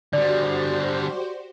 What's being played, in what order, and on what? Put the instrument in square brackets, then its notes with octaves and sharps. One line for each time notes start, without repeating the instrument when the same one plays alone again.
[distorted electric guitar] D3 G3 [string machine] F#4 G4 C5 [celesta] D5